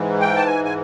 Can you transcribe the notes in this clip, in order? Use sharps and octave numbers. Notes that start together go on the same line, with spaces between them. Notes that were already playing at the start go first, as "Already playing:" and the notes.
Already playing: G#2 E3
G5
A5
G#5
G#5